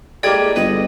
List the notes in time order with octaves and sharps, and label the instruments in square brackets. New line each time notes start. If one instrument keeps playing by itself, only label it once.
[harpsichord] A2 G#3 A#3 [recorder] G4 [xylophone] D5 G5 G#6
[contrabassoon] G1 [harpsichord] B4 [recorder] D#5